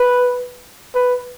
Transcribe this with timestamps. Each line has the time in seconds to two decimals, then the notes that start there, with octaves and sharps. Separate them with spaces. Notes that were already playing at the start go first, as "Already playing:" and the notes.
Already playing: B4
0.95 B4